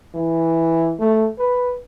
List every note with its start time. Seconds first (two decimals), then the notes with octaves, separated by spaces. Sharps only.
0.15 E3
0.99 A3
1.39 B4